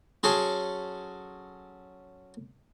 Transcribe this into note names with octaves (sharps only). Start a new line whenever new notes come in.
F#3 C#4 G#4 A4 C6